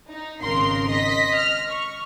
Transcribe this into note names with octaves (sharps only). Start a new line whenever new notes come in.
D#4
G#1 C#3 A#4 C6 C7
D#5 B6
F6
C#6